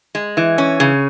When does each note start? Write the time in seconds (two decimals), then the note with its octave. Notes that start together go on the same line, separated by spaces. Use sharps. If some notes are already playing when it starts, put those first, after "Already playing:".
0.15 G#3
0.37 E3
0.58 C#4
0.80 C#3